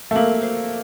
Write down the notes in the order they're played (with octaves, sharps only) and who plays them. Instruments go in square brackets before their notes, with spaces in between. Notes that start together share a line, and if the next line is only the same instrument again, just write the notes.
[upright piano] A3
[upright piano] A#3 [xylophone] A4
[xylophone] C5 F5